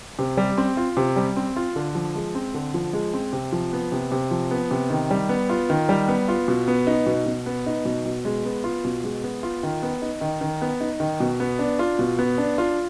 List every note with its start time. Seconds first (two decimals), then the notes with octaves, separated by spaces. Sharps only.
0.19 C3
0.37 G3
0.58 C4
0.77 F4
0.97 C3
1.16 G3
1.36 C4
1.56 F4
1.76 D3
1.95 F3
2.15 G#3
2.35 C4
2.54 D3
2.74 F3
2.93 G#3
3.13 C4
3.33 C3
3.52 F3
3.73 B3
3.92 C3
4.12 C3
4.31 F3
4.51 B3
4.71 C3
4.90 D#3
5.11 G3
5.29 B3
5.50 F4
5.70 D#3
5.89 G3
6.08 B3
6.28 F4
6.48 B2
6.68 B3
6.87 D#4
7.06 B2
7.26 B2
7.46 B3
7.67 D#4
7.85 B2
8.06 B2
8.25 G#3
8.45 B3
8.64 F4
8.85 B2
9.04 G#3
9.24 B3
9.43 F4
9.63 D#3
9.83 B3
10.02 D#4
10.21 D#3
10.41 D#3
10.62 B3
10.81 D#4
11.00 D#3
11.20 B2
11.40 B3
11.59 D4
11.79 F4
11.99 B2
12.19 B3
12.38 D4
12.58 F4